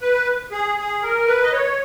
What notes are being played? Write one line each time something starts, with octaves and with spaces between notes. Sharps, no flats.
B4
G#4
G#4
A#4
B4
D#5
C#5